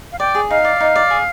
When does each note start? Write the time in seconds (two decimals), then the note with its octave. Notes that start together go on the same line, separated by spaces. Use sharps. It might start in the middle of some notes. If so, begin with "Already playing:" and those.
0.12 F5
0.19 D5 G5
0.35 G#4
0.50 D#4 F5
0.64 D5
0.80 D#4
0.96 D5
1.10 G#4